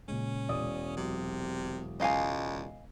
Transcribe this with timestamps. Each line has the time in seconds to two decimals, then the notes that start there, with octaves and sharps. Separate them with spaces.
0.08 A#2 C#3 G#3 C#4
0.49 E1 D5 D#6
0.97 C3 F#3
2.00 C#2 D#5 F5 G#5